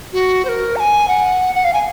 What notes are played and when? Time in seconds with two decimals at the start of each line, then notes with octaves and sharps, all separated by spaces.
0.13 F#4
0.45 C5
0.49 A#4
0.76 A#5
0.80 G#5
1.08 F#5
1.55 F#5
1.64 F5
1.73 G#5